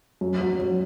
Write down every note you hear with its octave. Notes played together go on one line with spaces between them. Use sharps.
F#2
F#3
F#3